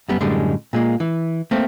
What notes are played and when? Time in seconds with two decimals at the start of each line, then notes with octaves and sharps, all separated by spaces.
0.08 F#2 G3 B3
0.21 F#2 A2 D3 G3 G#3
0.73 A#2 G#3 A#3
1.00 E3
1.51 A3 A#3 C4